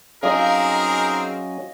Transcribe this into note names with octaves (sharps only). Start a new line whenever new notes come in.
F#3 C4 C#4 D#4 G#4 A#4 D#5 F5